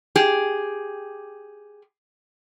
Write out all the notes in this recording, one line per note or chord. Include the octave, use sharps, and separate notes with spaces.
G4 G#4